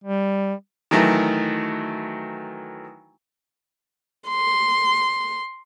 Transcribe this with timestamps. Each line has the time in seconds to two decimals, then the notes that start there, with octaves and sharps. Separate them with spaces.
0.04 G3
0.91 D#3 E3 F#3 A3
4.29 C6